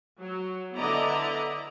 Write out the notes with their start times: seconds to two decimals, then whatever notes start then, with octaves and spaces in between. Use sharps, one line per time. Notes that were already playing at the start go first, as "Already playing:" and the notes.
0.20 F#3
0.76 D3 B3 E4 D5 D#5 A#5